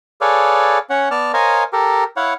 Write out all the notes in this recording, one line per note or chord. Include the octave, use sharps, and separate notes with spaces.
G#4 A4 B4 C#5 D5 F5
C#4 C#5 F#5
B3 D5 A5 F6
A#4 C5 C#5 D#5 F5 G#5
G4 A4 A#4
E4 C#5 F5 F#5